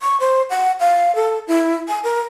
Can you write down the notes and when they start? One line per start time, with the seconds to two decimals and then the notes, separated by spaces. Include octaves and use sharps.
0.01 C#6
0.20 C5
0.50 F#5
0.80 F5
1.15 A4
1.48 E4
1.88 G#5
2.04 A#4